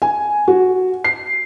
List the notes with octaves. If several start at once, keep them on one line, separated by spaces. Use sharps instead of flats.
G#5
F#4
C7